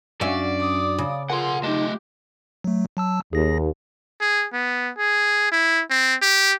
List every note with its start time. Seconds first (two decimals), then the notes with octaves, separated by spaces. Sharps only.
0.21 F#2 C#4 D4 F#4 D5 E5
0.59 D6 D#6
0.98 C#3
1.30 F4 G#4 A#4 F#5 G#5 C6
1.63 A3 D#4 G4 D#5 A5
2.64 F#3 A3
2.97 F#3 A5 E6
3.33 D#2 G#4 A#6
4.21 G#4
4.53 B3
4.98 G#4
5.52 E4
5.90 C4
6.22 G4